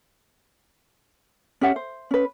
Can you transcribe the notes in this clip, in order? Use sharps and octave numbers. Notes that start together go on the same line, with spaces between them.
C#4 G4 E5 F#5
C5
C#4 B4